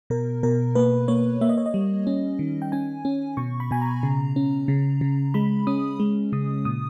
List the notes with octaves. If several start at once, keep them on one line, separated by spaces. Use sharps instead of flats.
B2 A#4
B2 A#4
A#3 B4
A#3 C#5
A#3 E5
D#5
C#5
D#5
G3
C#4
D#3
G5
C#4 G#5
C#4
B2 C#6
B5
B2 G#5
A#5
C#3
C#4
C#3
C#3
G#3 B5
C#4 D#6
G#3
C#3 D#6
A#2 D#6